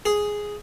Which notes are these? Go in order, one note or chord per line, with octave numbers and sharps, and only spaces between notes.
G#4